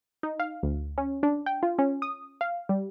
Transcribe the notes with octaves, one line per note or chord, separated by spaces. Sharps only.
D#4
F5
D2
C#4
D4
G5
F4
C#4
D#6
F5
G3